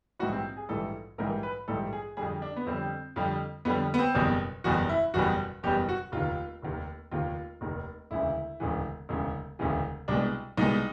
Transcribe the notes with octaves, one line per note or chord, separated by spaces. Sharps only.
A#1 G#2 E3 G3 F#4
C4
G#4
A#1 G#2 E3 G3 A4
A#1 G#2 E3 G3 A#4
B4
A#1 G#2 E3 G3 A4
G#4
F2 D3 G3 G#4
D4
B3
F2 D3 G3 C4
F2 D3 G3
F2 D3 G3 B3
B3
C4
F#1 E2 B2 G3
F#1 E2 B2 G3 F#4
E4
F#1 E2 B2 G3 F#4
F#1 E2 B2 G3 G4
F#4
F1 D#2 D#3 F4
F1 D#2 D#3
F1 D#2 D#3 F4
F1 D#2 D#3
E1 D2 C#3 E3 E4
E1 D2 C#3 E3
E1 D2 C#3 E3
E1 D2 C#3 E3
C2 B2 G#3 D4
C2 B2 G#3 D#4